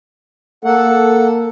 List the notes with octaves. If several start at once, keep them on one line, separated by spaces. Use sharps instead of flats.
A#3 A4 F#5